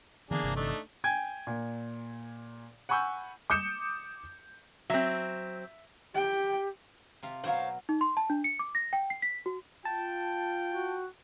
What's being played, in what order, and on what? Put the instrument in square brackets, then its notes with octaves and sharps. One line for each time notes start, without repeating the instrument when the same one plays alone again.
[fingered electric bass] D3 E3 B3 [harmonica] A#3 D4 G#4
[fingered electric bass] G1 C3 E3
[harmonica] A3 D4 D#4
[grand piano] G5 G#5 G#6
A#2
F#5 G#5 B5 C#6 E6 G6
[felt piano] D6 D#6 G6 C#7 E7
[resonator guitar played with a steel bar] F#3 C4 [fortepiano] E5
[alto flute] G4 [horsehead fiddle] G5
[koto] C3 F4 F5
[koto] B2 F#3 A#4 [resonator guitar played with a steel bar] C5 C#5 F5
[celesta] D#4
C6
A5
D4
C#7
D6
A#6
G5
C7
B6
F#4
[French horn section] F4 [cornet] G5 [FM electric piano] A5
[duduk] F#4